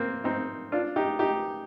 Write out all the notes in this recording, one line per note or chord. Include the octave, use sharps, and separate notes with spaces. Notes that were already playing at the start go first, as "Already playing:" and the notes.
Already playing: A#3 C4
C4 D#4
D4 F4
D#4 G4
D#4 G4